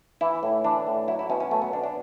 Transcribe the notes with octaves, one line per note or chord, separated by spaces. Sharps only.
E3 E4
A2
E3 D4
A2
F#3 E4
E4
B2 C#4
C#4
F#3 A3
B3
B2 D4
D4